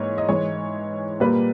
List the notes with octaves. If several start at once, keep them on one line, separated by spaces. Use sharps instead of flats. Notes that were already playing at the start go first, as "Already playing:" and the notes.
Already playing: G#2 E3 A#3 C#5
D#5
G#2 E3 G#3 C#5
A#2 G3 A#3 B4